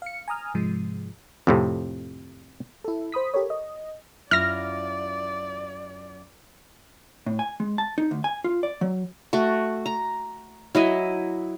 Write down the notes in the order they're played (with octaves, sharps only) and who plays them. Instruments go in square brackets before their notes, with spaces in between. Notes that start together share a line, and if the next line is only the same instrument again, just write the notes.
[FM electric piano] F5 C#7
G#5 A#5 D#6 F6
G#2 C3 F3 G#3
[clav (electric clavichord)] F2 A2 C3
[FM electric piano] E4 A4
C5 B5 D#6 B6
G4 A4 A#4 C#5
D#5
[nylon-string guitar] F#2 E4 F4 [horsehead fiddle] D5 [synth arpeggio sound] F6 A#6
[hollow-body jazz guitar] A2
G#5
G#3
A5
D#4
D2
G#5
F4
D5
F#3
[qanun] A3 F#4
A#5
F#3 E4 D#5